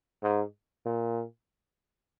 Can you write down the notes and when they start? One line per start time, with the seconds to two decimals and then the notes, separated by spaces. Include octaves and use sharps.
0.23 G#2
0.85 A#2